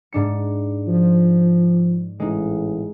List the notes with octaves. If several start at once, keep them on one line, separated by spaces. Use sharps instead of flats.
G#2 D4 C#7
F3
A1 G#3 D#4